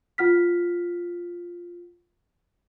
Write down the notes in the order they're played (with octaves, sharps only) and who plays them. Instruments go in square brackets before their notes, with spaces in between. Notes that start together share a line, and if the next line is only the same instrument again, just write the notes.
[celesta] F4 F#5 F6 B6